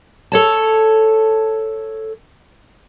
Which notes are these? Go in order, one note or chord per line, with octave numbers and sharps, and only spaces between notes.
A4 C#5 A5